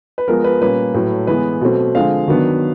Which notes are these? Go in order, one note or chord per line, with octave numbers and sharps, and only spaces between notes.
B4
F3 G#3 B3 A#4
B4
A#2 G3 A#3 C#4 B4
A2 F#3 A3
E3 G#3 B3 B4
B2 F#3 A3 C4
D3 F3 G#3 C4 F5
D#3 F#3 B3 D4